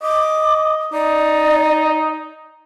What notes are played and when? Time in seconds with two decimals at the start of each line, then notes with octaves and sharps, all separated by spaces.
0.02 D#5 D6
0.93 D#4 D5